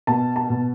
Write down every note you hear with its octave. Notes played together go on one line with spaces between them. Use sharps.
B2 A5
A5
B2